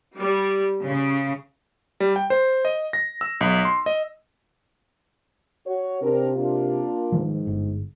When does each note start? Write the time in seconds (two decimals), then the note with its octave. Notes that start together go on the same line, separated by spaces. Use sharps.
0.17 G3
0.84 C#3
2.00 G3
2.16 G5
2.30 C5
2.65 D#5
2.93 A#6
3.21 E6
3.41 B1
3.65 C6
3.86 D#5
5.67 F#4 C#5
6.02 C3 C4 D4 A#4
6.36 A#3 D4 F4
7.12 G#2 D#3 F3
7.47 G1